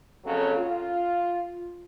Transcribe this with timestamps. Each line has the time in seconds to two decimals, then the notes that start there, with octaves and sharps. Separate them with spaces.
0.24 F2 C#3 F#3 A#3 C#4 A4
0.56 F4